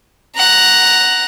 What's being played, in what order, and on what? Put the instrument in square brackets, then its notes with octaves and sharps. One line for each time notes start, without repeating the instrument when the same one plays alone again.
[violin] F#5 A#5